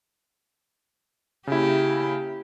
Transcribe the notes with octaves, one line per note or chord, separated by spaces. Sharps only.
C#3 A#3 E4 G4